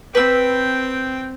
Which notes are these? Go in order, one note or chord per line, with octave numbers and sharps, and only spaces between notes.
C4 B4 G5 E6